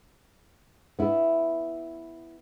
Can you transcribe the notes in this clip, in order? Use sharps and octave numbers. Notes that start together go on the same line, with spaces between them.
B3 E4